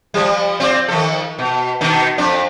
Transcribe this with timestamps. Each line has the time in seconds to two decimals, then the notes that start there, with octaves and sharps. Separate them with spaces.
0.14 F3 G3
0.60 C4 F4 D5
0.88 D#3 F3 A4
1.39 B2
1.81 B2 D#3 D#4
2.18 F2 D4